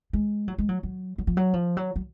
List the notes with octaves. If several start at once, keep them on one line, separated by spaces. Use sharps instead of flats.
G#3
F#3
G#3
F#3
F#3
F#3
F3
F#3
F3
F#3
F#3